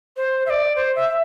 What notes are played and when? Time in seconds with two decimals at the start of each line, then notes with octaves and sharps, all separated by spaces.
0.17 C5
0.46 E5
0.50 D5
0.76 C5
0.96 E5